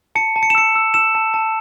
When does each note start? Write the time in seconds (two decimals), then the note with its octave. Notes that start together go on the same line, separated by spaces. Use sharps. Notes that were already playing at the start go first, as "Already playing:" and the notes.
0.15 A5 C#7
0.36 A5
0.43 C#7
0.50 E7
0.55 E6 C#7
0.75 E6
0.94 E6 E7
1.15 A5
1.34 A5